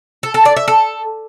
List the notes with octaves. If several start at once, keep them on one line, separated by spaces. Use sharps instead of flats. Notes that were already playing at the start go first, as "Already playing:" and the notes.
A4
A4
D5
E5
A4